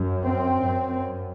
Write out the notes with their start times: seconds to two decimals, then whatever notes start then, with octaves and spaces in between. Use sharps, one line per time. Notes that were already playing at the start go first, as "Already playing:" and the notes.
Already playing: F#2
0.24 C4
0.65 F#2